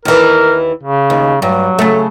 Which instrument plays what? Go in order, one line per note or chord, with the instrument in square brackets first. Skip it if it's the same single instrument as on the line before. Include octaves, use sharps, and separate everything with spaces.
[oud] D#2 E3 [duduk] A#4
[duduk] C#3
[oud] D#2
[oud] G2 [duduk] F#3
[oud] C#3 A3